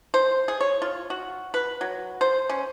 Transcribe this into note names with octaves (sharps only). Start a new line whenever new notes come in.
C5
G#4
C#5
F4
F#4
B4
F#3
C5
C#4